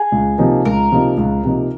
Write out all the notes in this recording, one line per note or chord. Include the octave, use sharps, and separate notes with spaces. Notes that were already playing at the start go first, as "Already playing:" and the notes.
Already playing: G#4
C#2
C3 F3 A#3 D#4
C#2 A#4
C3 F3 A#3 D#4
C#2
C3 F3 A#3 D#4